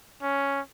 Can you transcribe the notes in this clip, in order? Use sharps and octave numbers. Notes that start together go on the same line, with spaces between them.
C#4